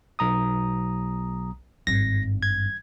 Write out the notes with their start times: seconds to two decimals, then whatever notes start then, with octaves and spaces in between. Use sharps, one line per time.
0.19 B1 A#5 D#6
1.87 G#1 G2 A#6
2.43 G#6